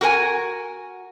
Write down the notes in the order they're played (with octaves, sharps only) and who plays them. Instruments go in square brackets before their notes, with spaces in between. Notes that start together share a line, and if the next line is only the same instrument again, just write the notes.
[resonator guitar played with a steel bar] F#4 A#4 B4 G#5